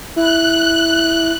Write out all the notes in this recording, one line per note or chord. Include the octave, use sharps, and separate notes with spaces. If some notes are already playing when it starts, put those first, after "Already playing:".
E4 F#6